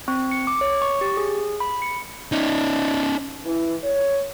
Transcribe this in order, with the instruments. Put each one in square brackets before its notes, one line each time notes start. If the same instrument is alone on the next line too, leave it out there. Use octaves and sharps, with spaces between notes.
[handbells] C4
C#7
D6
C#5
C#6
G4
G#4
B5
C#7
[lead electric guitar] C#4 D#4
[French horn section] E3
C#5